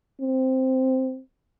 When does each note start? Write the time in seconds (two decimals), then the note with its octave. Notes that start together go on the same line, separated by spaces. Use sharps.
0.21 C4